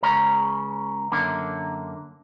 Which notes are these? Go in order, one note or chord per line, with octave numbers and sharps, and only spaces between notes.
C#2 C#3 C#4 A#5
F#2 D3 A#3